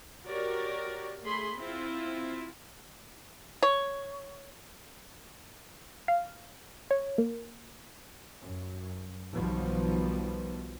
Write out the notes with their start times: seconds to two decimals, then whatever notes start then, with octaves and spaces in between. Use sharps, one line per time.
0.26 F#4 G4 A#4 C#5 D5
1.23 A3 G#4 B5 C6
1.57 C4 E4 F4
3.63 C#5
6.08 F5
6.91 C#5
7.18 A#3
8.41 F#2
9.32 B1 B2 D#3 F3 G3 B3